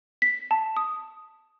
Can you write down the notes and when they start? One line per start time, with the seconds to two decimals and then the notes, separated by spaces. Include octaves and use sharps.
0.22 B6
0.51 A5
0.77 D#6